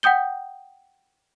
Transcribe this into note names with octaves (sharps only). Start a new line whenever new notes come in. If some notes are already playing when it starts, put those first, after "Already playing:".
F#5 G5 D#6 G6 G7